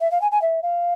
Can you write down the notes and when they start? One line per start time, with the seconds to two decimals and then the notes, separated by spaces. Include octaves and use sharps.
0.01 E5
0.12 F5
0.22 G#5
0.32 G#5
0.42 E5
0.63 F5